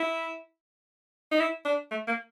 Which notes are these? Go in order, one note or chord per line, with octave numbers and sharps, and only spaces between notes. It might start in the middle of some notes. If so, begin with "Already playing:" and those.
Already playing: E4
D#4
E4
D4
A3
A#3